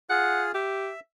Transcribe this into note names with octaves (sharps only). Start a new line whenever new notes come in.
F4 G#4 F#5
G4 E5